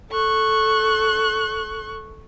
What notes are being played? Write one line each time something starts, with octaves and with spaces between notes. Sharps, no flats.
A4 C#6 F#6